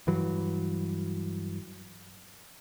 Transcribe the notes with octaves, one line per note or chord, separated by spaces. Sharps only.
G2 E3 F#3